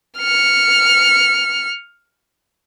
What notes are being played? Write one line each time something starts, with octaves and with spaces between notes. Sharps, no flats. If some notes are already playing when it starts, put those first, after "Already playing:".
F6 C#7